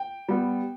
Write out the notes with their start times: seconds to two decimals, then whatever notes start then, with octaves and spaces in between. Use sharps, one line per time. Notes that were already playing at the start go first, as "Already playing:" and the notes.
Already playing: G5
0.29 G3 B3